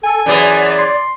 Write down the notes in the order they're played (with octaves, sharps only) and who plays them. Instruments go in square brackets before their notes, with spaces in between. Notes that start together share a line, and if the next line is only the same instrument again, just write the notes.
[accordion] A4 [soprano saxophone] G#5
[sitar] F#2 E3 G#4 [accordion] D5
[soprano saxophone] C6